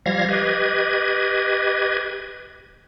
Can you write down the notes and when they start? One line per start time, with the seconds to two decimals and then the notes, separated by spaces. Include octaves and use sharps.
0.06 F3 G3 F5 G#6 A#6
0.29 G4 B4 D#5 G#6